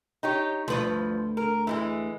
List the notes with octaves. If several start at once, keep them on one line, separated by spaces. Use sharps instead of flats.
D#4 G4 C#5
D2 G2 F3 B4
A#4
E3 G3 G#3